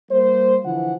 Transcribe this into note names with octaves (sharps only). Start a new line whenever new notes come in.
G3 A#3 C5
D3 E3 F3 E4 F#5